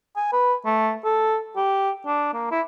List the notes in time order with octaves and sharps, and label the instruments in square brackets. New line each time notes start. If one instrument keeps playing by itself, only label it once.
[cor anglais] G#5
B4
A3
A4
G4
D4
A#3
E4